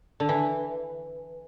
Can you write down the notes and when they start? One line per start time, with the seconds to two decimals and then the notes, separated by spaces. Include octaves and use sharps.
0.20 D3
0.29 E3